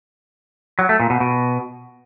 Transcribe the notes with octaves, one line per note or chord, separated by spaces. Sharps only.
F#3
A3
A#2
B2
B2